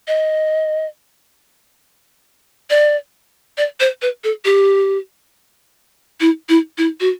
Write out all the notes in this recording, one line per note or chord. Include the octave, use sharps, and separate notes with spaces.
D#5
D5
D5
C5
B4
A4
G4
E4
E4
E4
F#4